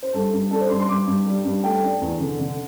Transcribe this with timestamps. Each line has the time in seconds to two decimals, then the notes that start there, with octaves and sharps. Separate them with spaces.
0.03 C5
0.13 G2 A4
0.33 G2
0.51 D4 A4
0.61 C5
0.69 G2 C6
0.80 C6
0.88 G2 D6
1.07 G2
1.26 G3
1.45 G2
1.64 A3 G5
1.84 D4
2.01 E2
2.20 D3
2.40 D3